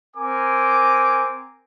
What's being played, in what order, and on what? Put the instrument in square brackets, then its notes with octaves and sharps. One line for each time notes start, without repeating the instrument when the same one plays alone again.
[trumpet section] C4 A#4 G#5 D6